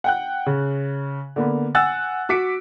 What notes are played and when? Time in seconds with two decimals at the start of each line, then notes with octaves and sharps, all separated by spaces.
0.04 F#5 G5 F#6
0.46 C#3
1.36 D3 A#3 B3
1.75 F#5 G#5 E6 F#6 A6
2.29 F#4 D6 B6 C#7 D7